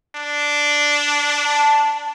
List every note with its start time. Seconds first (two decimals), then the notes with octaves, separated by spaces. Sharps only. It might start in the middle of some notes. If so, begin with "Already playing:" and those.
0.16 D4
1.45 A5